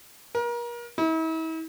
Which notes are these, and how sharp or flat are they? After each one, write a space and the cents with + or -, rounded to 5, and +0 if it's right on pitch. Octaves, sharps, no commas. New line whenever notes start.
A#4 +35
E4 -40